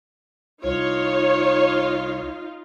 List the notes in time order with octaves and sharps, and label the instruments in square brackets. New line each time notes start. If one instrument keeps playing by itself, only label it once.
[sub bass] C2 [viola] D#4 F4 [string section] C#5